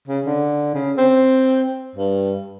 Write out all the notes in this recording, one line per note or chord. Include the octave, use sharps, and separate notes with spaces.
C#3
D3
C#3
C4
G2